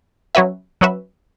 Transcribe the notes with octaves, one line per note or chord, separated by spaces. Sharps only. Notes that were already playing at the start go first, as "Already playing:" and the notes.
F#3 C#4 F#4 B4 E5
F#3 C#4 F#4 B4 E5